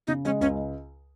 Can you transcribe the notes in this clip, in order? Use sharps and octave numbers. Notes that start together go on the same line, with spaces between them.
C#3 D#4
G#3 C#4
C#2 C#4